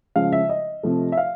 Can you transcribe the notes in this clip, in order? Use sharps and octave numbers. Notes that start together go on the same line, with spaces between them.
C#3 F3 G#3 F5
E5
D#5
C3 F3 A3
E5
F5